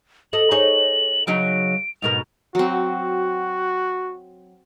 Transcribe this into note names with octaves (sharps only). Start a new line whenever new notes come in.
A4 D#5 F#7
D#4 G#4 C#5
C#3 F#3 D#4 D7
G#2 B2 A#4 F7
F#3 C4 F#4